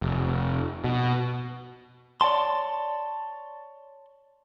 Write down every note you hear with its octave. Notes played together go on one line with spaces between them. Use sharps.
F1
B2
C#5 D5 G5 A5 C6